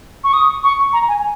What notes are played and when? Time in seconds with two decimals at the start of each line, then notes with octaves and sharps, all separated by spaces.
0.24 C#6
0.34 D#6
0.64 C#6
0.93 A#5
1.08 G#5